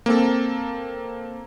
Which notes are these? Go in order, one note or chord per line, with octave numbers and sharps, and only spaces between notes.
A#3 C4 A4